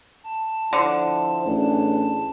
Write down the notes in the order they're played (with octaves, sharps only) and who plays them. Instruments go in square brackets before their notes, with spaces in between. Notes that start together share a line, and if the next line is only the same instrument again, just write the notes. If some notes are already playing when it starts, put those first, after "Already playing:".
[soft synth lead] A5
[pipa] D3 [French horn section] F3 E4 C5
[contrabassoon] A1 [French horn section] D4 G#4